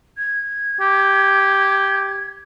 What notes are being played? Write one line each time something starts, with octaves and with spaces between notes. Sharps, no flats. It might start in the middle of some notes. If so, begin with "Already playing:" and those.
G#6
G4